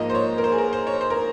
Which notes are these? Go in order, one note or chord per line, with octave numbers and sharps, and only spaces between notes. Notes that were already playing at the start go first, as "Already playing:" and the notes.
Already playing: G#2 F3 A#3 D#5
C5
C#5
A#4
C5
G#4
A#4
C5
C#5
C5
A#4